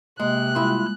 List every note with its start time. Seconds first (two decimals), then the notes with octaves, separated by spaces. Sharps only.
0.20 C3 G#3 A#3 F#6
0.55 G3 G#3 E4 F4 D#6